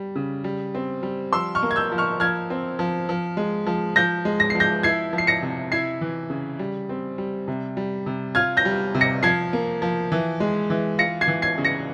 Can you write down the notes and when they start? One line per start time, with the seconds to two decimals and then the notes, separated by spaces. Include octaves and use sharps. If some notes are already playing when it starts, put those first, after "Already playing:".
Already playing: G3
0.15 C#3
0.44 G3
0.75 C4
1.03 G3
1.32 F3 C6 E6
1.55 C#6 F6
1.62 A#3
1.71 G#6
1.76 E6 G6
1.92 F3
1.98 C#6 F6
2.20 F3 F6 G#6
2.50 C4
2.79 F3
3.09 F3
3.37 G#3
3.66 F3
3.96 F3 G6 A#6
4.25 G#3
4.40 A#6
4.50 F3 C7
4.60 G6 A#6
4.83 E4 G#6 C7
5.13 F3
5.18 C7
5.27 A#6 C#7
5.42 C3
5.72 E4 G#6 C7
6.01 E3
6.30 C#3
6.59 G3
6.89 C4
7.18 G3
7.48 C3
7.77 G3
8.06 C3
8.35 F4 F6 G#6
8.57 G6 A#6
8.65 G3
8.95 C3
9.01 A#6 C#7
9.23 F3 G#6 C7
9.53 A#3
9.82 F3
10.12 E3
10.40 G#3
10.70 E3
10.98 F4 A#6 C#7
11.21 G#6 C7
11.28 E3
11.42 G#6 C7
11.58 C#3
11.65 A#6 C#7